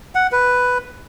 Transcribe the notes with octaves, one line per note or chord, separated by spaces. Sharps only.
F#5
B4